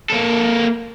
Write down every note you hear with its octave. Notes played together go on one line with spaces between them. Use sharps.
A#3 A4